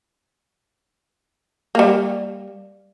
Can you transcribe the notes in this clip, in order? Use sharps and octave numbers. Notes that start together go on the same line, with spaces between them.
G3 A#3